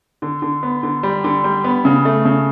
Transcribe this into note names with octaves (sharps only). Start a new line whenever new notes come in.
D3
D3
B3
D3
G3
D3
G3
B3
C#3
A3
C#3